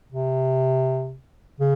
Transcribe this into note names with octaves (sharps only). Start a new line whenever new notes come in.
C3
C#3